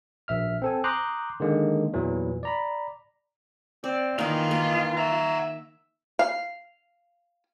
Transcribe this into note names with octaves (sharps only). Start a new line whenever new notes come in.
A#1 E5 F6
C4 A4 G#5
A#5 C6 D6 D#6 F#6 G6
D3 D#3 G#3 A#3
E2 A#2 E3 F#3
D5 A#5 B5
C4 D5
D#3 E3 A#3 F4 A#4 D#5
A#3
E5 F#5 A#5
F5